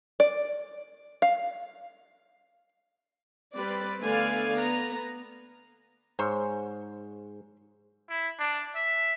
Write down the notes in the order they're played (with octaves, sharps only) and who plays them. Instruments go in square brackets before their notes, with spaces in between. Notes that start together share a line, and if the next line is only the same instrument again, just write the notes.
[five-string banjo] D5
F5
[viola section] G3 C4 B4 D5
D3 A3 B3 D5 F5 G#5
B3 A#5
[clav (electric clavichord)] G#2 [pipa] C5 C#5
[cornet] E4
D4
E5